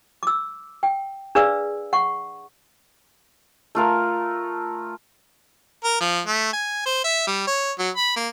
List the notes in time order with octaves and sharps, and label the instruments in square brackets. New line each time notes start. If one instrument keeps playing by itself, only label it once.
[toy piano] D6 E6
G5
D4 G#4 B4 D5 F5 E6
F#5 C#6
[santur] A3 F4 A#4
[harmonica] A#4
F3
A3
G#5
C5
E5
G3
C#5
F#3
B5
A#3